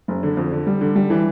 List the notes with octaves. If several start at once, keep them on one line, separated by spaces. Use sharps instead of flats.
F#1
D3
F2
D3
G3
D3
G3
E3